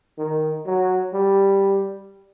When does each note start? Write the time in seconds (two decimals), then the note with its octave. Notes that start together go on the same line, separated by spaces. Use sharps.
0.18 D#3
0.66 F#3
1.13 G3